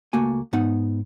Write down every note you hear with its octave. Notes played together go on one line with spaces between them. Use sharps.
C#2 A3 A#3 F#4 G#5
G#2 B3 D#4 F#5